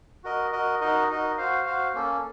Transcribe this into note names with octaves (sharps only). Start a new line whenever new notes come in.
F#4 A#4 D#5
F#4 A#4 D#5
D#4 F#4 A#4 D#5
D#4 F#4 A#4 D#5
F#4 C5 F5
F#4 C5 F5
A#3 C#4 A4